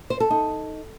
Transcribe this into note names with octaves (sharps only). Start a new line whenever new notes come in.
C5
A4
D#4